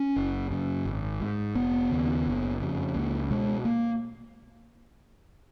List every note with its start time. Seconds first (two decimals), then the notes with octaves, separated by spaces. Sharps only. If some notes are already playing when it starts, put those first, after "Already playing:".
Already playing: C#4
0.16 F#1
0.51 F#2 C#3
0.86 G#1
1.21 G#2
1.55 F1 B3
1.91 D#2 C#3
2.26 F#1
2.61 F2 C#3
2.95 C#2 A#3
3.30 B2 G#3
3.65 A#3